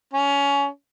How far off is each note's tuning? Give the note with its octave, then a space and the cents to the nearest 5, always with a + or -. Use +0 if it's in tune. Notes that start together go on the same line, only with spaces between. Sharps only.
C#4 +20